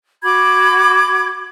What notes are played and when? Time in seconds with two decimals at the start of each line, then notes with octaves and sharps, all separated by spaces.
0.23 F#4 B5 D6 G#6